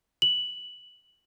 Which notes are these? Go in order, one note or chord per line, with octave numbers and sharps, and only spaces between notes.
F#7